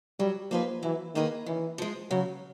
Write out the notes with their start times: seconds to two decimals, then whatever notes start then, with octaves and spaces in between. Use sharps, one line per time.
0.19 F#3 G3
0.51 F3 A#3 D#4 G#4 B4
0.83 E3 F#3
1.15 D#3 A#3 D#4 G#4 B4
1.46 C#3 E3
1.78 F3 G#3
2.11 C#3 F#3